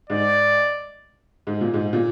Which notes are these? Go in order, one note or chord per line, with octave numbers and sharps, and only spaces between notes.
G#2 D5
G#2
A#2
G#2
A#2